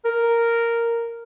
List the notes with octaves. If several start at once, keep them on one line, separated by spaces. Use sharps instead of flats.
A#4